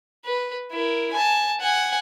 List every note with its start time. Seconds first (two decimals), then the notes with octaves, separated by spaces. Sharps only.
0.24 B4
0.72 E4 A#4
1.13 G#5 A5
1.60 F#5 G#5